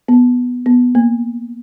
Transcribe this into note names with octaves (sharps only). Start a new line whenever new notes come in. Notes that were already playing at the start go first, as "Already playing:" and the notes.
B3
B3
A#3